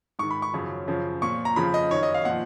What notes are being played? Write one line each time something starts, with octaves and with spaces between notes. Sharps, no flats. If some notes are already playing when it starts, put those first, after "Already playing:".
G#2 D#3 C#6
B5
C#6
F#2 C#3 F3
F#2 C#3 F3
A#2 F3 C#6
A#5
F2 C#3 F3 B5
D#5
F#2 D#3 C#5
D#5
F5
A#2 F3 F#5